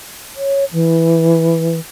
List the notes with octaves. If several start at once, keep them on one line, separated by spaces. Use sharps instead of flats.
C#5
E3